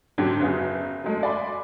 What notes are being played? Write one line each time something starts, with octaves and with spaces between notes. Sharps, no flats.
G#2 D3 F#3 G4 G#6
F#1 F#3 B3 G#4
F#3 G#3 A3
D5 G#5 B5 C6